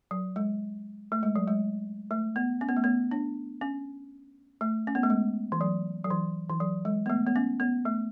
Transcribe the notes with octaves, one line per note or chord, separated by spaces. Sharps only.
F#3
G#3
A3
G#3
F#3
G#3
A3
B3
C#4
B3
A3
B3
D4
C#4
A3
C#4
B3
A3
G#3
E3
F#3
F#3
E3
E3
F#3
G#3
B3
A3
B3
C#4
B3
A3